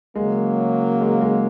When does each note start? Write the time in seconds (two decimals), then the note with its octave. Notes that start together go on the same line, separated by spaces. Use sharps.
0.15 C#3 F#3 G#3 A#3
1.01 G#3
1.21 G#3